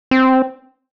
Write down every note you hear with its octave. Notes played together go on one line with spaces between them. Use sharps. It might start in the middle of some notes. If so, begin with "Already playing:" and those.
C4